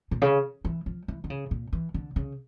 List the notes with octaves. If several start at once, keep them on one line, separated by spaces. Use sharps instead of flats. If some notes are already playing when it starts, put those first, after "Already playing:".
A#2
C#3
E3
F3
E3
D3
C#3
A#2
E3
D3
C#3